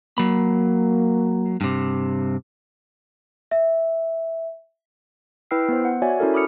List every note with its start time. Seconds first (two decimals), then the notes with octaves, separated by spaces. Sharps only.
0.18 F#3 A#3 B5
1.61 G2 C3
3.51 E5
5.51 E4 B4 G5 E6 F6 C7
5.69 B3 C5
5.85 F#5
6.02 F#4 C#5 D5 E5 G#5
6.20 C#4 E4 F#4 A4 A#4
6.34 B5 D6 D#6 F6 C#7